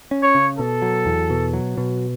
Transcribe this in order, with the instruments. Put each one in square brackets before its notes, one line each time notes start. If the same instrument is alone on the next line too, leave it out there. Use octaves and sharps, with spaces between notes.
[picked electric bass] C#4
[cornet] C#5
[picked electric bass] C#3
[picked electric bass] B2 [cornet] A4
[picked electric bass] F#3
E2
B2
F#3
B2